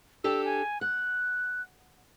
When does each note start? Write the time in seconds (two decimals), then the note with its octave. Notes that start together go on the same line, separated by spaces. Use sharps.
0.24 D4 G4 A4 E6
0.45 G#5
0.81 F#5 F#6